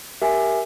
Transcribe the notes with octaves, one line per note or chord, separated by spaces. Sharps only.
G4 A#4 E5 G#5